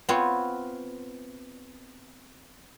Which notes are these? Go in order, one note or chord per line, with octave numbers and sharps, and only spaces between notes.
B3 C4 F4 C#5